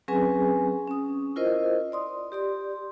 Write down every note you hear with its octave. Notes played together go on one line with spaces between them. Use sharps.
F#3 C4 C#4 G#4 B4 G#5
C#4 D#6
E4 F4 A#4 C5 D#5
D5 C6 D#6
G4 D5 C6